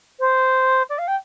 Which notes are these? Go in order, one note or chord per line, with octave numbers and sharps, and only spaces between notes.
C5
D5
F5
G5